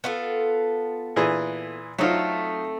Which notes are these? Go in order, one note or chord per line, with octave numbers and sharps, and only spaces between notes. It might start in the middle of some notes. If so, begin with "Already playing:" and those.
B3 F4 A4
A#2 E3 G#4
F#3 A3 C4 D#4 F4